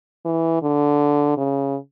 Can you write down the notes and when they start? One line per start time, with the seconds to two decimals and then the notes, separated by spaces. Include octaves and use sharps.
0.25 E3
0.62 D3
1.37 C#3